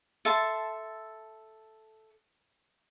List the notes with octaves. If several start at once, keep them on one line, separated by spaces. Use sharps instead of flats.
A4 E5 A5 C6